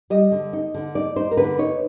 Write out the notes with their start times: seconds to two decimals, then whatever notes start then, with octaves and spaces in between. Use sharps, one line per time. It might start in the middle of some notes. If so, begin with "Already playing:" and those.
0.10 G3 D#5
0.32 D3
0.53 D#4
0.74 D3
0.95 D#4 D5
1.16 D#4 C5
1.31 A#4
1.37 D3 B4
1.58 D#4 C#5